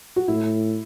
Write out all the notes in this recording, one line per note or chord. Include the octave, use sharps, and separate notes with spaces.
F#4
A2 E4